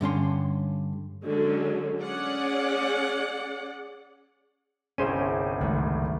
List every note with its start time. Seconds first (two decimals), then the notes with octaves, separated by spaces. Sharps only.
0.01 G2 D3 C#4 C6
1.24 D3 F#3 G#3 C#4
2.00 C#4 G#4 D5 F#5
4.98 G1 C2 C#4 E4 G#4 C5 G5 D#7
5.61 C#2 A2 D#3 F#3